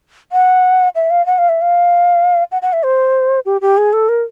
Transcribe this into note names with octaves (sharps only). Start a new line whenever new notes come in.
F#5
E5
F5
F#5
F5
E5
F5
F#5
F#5
E5
C5
G4
G4
G#4
A4
A#4